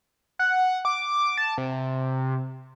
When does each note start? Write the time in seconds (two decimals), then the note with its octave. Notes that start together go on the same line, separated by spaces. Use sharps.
0.39 F#5
0.85 D6
1.38 A5
1.58 C3